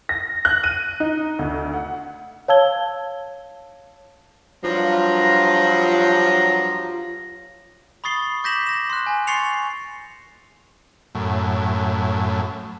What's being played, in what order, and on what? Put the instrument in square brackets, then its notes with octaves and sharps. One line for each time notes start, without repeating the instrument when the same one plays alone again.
[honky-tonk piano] A#6
F#6
D#7
D#4
D2
F#5
[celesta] C#5 F5 A5 E6 G#6 G7
[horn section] G2 F3 [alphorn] F#3 [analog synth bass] F4 [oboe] A#5
[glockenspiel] B5 C#6 D#6 A6 C7 G7
D6 G6 A#6 B6 E7 F#7
A#6 E7
C6 F#6
G#5
C6 C#6 A6 C7 C#7 F7
[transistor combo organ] F#2 A2